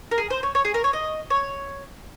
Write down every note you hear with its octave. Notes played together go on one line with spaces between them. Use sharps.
A#4
G#4
C5
C#5
C#5
G#4
A#4
C#5
D#5
C#5